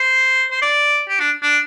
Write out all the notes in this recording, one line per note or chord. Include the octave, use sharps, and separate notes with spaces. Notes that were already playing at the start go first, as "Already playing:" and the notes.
Already playing: C5
C5
D5
G4
D4
D4